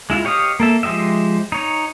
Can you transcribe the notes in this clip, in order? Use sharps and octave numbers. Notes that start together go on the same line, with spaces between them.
G#3 E4 F4
G4 C#5 D#5 F5 D#6
A#3 A4 E5
F3 G#3 G4 D#5 E5
D#4 C#5